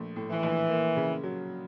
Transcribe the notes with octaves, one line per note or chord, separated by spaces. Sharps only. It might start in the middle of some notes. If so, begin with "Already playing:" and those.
Already playing: A#1 A3
A2
E3
A#1
A#3
C#3
F#3